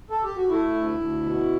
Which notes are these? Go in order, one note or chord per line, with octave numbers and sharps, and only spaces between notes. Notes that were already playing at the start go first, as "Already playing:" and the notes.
A4
G4
F#4
A3 E4
D2
D2
B2